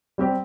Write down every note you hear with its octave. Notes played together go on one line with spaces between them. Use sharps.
G3 C4 G4